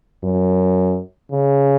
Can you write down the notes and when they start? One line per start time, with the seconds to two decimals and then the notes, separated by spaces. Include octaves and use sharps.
0.24 F#2
1.32 C#3